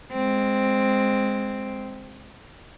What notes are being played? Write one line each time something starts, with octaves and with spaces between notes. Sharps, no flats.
G#3 C4